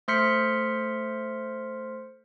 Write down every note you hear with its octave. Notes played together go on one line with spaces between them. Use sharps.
A3 C5 C6 F6 B6 C#7